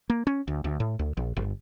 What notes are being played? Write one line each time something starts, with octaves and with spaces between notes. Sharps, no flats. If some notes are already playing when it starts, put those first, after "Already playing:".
A#3
C#4
D2
D2
A2
D2
A#1
G1